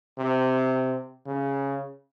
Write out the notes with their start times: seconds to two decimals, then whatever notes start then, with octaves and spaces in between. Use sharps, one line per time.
0.18 C3
1.26 C#3